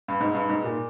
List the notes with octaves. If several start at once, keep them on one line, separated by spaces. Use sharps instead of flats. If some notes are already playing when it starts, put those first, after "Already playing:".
G2
G#2
G2
G#2
A#2